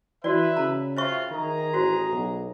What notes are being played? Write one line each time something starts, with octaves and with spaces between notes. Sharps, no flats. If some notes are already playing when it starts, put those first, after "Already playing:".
E3 F#4 B4 D5 E5
C#3 A#5
C4 F4 C5 E5 C#6
D#3 G#4 A#5
A1 F#4 C5
B1